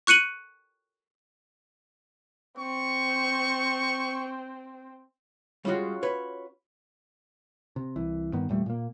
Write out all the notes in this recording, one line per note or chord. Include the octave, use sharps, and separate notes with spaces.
C#6 F#6 C#7 D#7 F#7
C4 C#6
G3 G#3 C#4 F4 F#4
B4 C#5
C3
C2 E3
G2 D#3 B3
E2 A#2 G3 A3
A#2 A#3